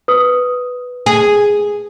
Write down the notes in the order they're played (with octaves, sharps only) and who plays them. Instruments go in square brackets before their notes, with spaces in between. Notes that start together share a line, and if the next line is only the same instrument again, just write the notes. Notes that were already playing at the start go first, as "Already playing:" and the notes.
[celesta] B4 D#6
[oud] G#4